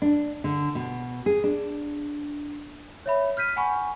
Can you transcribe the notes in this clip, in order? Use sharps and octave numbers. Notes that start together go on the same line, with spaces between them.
D4
D3
B2
G#4
D4
C#5 E5 B5
F6 G6 B6 D#7
F#5 G#5 B5 C#6